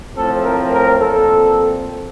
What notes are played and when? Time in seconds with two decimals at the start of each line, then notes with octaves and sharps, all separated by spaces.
0.15 A2 F3 A3 C4 A4
0.44 A#4
0.72 A#4
0.99 A#2 F3 C4 A4